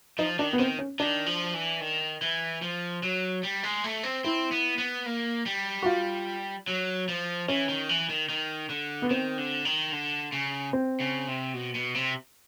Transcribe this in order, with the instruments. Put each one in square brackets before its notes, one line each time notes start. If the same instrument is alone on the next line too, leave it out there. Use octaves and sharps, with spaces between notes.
[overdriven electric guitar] F3 [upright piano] D#4
[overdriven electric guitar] D#3 [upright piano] D4
[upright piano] B3
[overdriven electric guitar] D#3 [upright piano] C4
[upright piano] C#4
[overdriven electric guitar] D#3 [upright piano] D4
[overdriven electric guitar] F3
E3
D#3
E3
F3
F#3
G3
G#3
A3
C4
[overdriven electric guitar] C4 [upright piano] E4
[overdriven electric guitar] B3
B3
A#3
G3
[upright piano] F#4
F4
[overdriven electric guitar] F#3
F3
[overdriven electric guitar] E3 [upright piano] C#4
[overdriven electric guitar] D#3
E3
D#3
D#3
D3
[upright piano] B3
[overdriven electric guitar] D#3 [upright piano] C4
[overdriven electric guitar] D3
D#3
D3
C#3
[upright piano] C4
[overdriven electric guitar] C#3
C3
B2
B2
C3